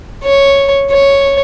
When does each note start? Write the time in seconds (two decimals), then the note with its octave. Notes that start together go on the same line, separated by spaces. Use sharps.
0.24 C#5
0.91 C#5